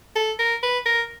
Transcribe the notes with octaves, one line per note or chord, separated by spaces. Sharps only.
A4
A#4
B4
A#4